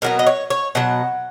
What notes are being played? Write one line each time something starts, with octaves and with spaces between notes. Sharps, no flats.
B2 F#3 B3 A#4
D#5
C#5
C#5
B2 F#3 F#5